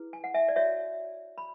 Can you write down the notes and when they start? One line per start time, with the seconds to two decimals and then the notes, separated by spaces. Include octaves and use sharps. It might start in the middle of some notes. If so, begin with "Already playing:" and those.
Already playing: E4 G#4 B4
0.13 G#5
0.24 F#5
0.34 E5 G#5
0.49 D5
0.56 F#4 C#5 E5
1.38 B5